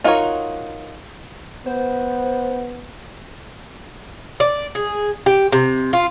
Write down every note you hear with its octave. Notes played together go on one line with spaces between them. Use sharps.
D#4 F4 F#4 A#4 C#5
B3 C5
D5
G#4
G4
C3
F4